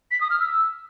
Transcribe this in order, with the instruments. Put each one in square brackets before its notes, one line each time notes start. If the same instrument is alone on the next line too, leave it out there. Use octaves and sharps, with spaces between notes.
[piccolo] B6
D#6
F6
E6